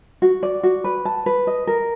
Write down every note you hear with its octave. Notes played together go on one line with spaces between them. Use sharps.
F#4
D5
F#4
B4
A5
B4
D#5
A#4